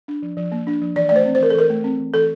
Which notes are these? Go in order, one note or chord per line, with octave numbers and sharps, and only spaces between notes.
D4
F3
F3
A#3
D4
F3
E3 D5
A3 D5
C5
C4
C5
E3 A#4
A4
E3 A#4
A3
C4
E3
E3 A4